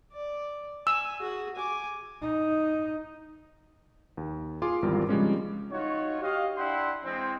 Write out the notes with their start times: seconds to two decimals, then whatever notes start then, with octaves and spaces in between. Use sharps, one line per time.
0.12 D5
0.87 G#5 E6
1.21 F#4 G#4
1.56 G#5 D6
2.22 D#4
4.17 D#2
4.62 F4 G#4 G#5 C6 D6
4.82 G#1 E2 G3 F4 A#4
5.09 C#3 F3 G3 G#3 C4 C#4
5.71 D#4 F4 F#4 C#5
6.21 G4 D#5 F5
6.55 D4 E4 F#5 G5 C6
7.03 E3 G#3 C4